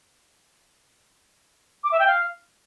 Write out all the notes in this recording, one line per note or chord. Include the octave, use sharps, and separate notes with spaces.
D6
E5
G5
F5